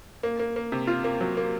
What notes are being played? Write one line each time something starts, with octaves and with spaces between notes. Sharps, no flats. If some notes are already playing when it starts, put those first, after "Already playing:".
A#3
A#3
A#3
C3
F4
A#3
F#3
A#3